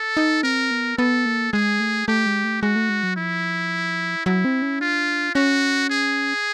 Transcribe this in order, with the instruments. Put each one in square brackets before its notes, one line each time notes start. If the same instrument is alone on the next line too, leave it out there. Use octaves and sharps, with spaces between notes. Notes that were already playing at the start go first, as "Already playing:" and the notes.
Already playing: [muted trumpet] A4
[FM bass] D#4
[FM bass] C4 [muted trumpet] A#4
[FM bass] B3
[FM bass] B3 [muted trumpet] A4
[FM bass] A#3
[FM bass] G#3 [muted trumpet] G#4
[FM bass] A3
[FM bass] A3 [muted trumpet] G4
[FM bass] G#3
A3
[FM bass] G#3 [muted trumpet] F#4
[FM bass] A3
G#3
F#3
[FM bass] F3 [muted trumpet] E4
[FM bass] F#3 [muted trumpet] E4
[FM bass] C4
C#4
[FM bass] D4 [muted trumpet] F4
[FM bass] C#4 [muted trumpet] F#4
[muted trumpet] G#4